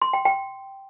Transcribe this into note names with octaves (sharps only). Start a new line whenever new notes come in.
C6
G5
G5